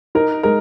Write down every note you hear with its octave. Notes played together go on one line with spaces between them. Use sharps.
D#4 A#4
G#3 A#4